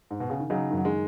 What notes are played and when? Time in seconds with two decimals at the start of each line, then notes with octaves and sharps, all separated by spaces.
0.11 G#2
0.20 B2
0.30 C#3
0.40 D#3
0.50 C#3 F#3 D#4
0.71 D#3
0.74 F#2 F#3
0.85 D#3 G#3